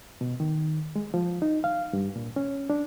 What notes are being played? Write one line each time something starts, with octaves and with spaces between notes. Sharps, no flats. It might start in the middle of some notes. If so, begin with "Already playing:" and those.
B2
D#3
G#3
F3
D#4
F5
G2
A#2
C#4
D4